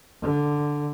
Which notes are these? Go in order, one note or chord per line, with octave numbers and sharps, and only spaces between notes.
D3